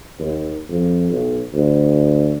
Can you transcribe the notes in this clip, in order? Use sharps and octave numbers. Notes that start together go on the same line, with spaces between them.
D#2
F2
B1
D2